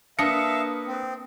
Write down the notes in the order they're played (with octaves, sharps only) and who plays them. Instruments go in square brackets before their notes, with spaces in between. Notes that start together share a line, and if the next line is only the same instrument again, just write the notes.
[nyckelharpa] A#3 B4 [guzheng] D4 [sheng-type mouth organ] E5 F5 [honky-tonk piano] D#6 A#6 C#7
[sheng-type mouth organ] C4